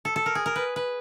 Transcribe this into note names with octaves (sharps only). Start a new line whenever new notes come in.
A4
A4
A#4
G#4
A#4
B4
B4